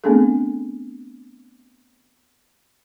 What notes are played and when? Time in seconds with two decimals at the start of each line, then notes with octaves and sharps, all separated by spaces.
0.04 A3 B3 C4 D4 G#4 A4